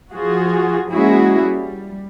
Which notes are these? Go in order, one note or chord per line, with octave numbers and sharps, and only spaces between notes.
F3 F4 F#4 G#4
G#3 A#3 C#4 E4 F#4 G#4
G3